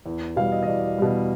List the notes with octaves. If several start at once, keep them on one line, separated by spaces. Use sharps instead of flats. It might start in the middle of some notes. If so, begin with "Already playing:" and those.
E2
B2 G3 F5
D#5
D#5
E2 D5
B2 G3